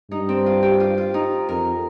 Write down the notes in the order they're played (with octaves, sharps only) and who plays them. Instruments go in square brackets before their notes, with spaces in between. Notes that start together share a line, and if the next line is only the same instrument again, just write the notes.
[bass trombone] G2 [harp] D#4
[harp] C4
F4
G4
F4
F4
D#4
[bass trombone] F2 [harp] A#4